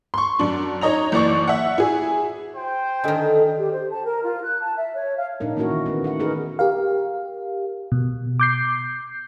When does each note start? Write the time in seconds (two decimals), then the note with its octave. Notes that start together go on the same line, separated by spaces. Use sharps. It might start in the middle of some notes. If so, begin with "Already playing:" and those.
0.14 C6 C#6
0.39 F#2 D4
0.81 D#4 C#5 D#5 A#5 F7
1.12 F#1 E3 D5 C#6
1.48 E5 F#5
1.78 E4 G#4
2.56 C5 G5
3.04 D3 D#3 A4 D#5 G#5
3.58 G4
3.72 C5
3.91 A5
4.05 A#4
4.23 F4
4.44 F#6
4.61 A5
4.76 E5
4.95 C#5
5.16 F5
5.40 A#2 D4 D#4 A#4
5.56 E3 A#3 C#4 E4 F#4 A#4
5.71 D#3
5.86 D#3 A3 B3
6.04 F#4 F#5
6.20 D#4 G#4 A#4 B4
6.59 G4 A#4 F5
7.92 B2
8.40 D6 G6 C7